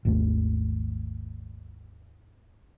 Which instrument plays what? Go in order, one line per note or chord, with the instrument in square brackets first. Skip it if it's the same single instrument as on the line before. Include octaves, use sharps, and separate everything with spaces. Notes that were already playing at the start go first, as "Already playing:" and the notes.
[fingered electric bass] G#1 D#2 A3